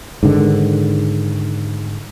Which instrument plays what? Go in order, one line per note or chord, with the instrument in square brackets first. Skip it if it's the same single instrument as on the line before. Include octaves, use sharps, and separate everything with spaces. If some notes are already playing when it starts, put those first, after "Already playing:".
[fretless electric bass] G#2 D3 D#3